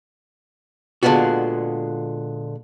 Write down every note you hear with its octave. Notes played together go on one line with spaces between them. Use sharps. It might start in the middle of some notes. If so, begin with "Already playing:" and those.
A#2 D3 G#3 B3 F4 F#4